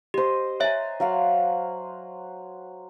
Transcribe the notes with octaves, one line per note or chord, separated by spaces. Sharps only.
G4 C5 D#5
C#5 E5 G#5 A#5
F#3 F5 F#5